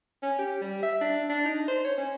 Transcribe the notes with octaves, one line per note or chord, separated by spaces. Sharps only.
C#4
G4
G3
E5
D4
D4
D#4
C5
C#5
C#4